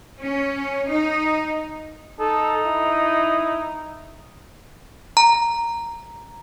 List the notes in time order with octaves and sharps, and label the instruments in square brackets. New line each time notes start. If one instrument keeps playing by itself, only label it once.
[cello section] C#4
D#4
[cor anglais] D#4 [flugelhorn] A4
[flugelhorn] E4
[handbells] A#5